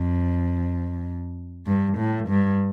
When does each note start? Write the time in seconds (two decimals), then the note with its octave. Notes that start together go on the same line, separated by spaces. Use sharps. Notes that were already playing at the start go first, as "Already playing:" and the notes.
Already playing: F2
1.67 G2
1.98 A2
2.29 G2